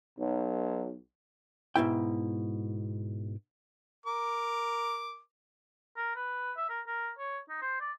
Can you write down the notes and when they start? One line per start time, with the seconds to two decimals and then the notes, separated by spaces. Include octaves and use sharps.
0.18 B1
1.76 G#2 B2 E4 G5
4.06 A#4 D6
5.97 A#4
6.16 B4
6.57 E5
6.69 A#4
6.87 A#4
7.18 C#5
7.49 D#4
7.62 C5
7.81 D5